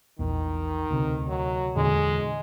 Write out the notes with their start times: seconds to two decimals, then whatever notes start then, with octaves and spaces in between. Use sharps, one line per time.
0.19 A#1 E2 D#3
0.91 D2 C3
1.28 F#3
1.76 E2 A#2 D3 G#3